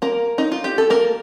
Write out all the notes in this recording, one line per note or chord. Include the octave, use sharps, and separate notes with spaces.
A#3 A#4
D#4
F4
G4
A4
A#3 A#4